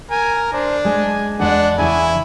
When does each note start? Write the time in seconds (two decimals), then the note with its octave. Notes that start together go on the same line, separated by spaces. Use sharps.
0.10 A#4 G#5
0.53 D4 C5
0.85 G#3 G#5
1.40 E2 G#3 D4 D5 F#5
1.78 E2 C#3 E3 E4 G#5